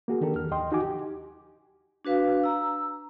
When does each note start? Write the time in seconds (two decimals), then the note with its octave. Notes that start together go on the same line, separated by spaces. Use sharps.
0.08 A#3 F#4 G#4
0.21 D#3 D4 G4 A4 A#4
0.35 E2 F6
0.51 D#2 D#5 G5 C6
0.72 D#4 F#4 G4 G#5 D6
0.83 G4
2.05 D4 F#4 B4 F5
2.43 A#5 E6